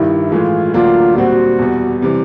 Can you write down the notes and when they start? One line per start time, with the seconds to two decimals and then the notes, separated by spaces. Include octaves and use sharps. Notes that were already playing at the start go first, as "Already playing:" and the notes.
Already playing: G2 D#3 G3 E4
0.32 A2 E3 G#3 F4
0.74 D2 D3 F#3 A#3 D4 F4
1.16 A#2 G3 C4 F#4
1.59 E2 B2 G3
2.02 C3 E3 G3